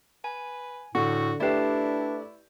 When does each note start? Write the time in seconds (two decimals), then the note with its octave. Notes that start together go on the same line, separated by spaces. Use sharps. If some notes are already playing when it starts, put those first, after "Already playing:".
0.24 B4 G#5
0.95 A2 D3 F#4 C#6
1.40 A3 D4 E4 G4 B4 D5 E5